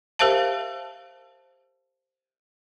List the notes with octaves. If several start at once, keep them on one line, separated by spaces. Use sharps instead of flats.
G4 A#4 C5 E5 F5 A5